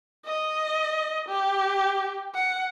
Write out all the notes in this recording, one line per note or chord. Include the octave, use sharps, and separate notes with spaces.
D#5
G4
F#5